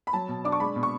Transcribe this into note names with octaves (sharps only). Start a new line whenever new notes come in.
B5
F#3 A5
B2
D4 D6
C#6
G#3 B5
B2
C#6